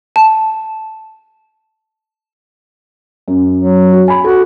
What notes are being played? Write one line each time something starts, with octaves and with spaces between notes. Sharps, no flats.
A5
F#2
F#3
F#4
G#5 B5
F#4 A4